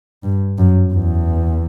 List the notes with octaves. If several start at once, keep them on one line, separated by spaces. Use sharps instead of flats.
G2
F#2
E2